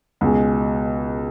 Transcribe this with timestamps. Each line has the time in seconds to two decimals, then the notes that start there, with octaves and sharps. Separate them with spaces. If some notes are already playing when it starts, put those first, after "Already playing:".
0.21 C#2 B2 G#3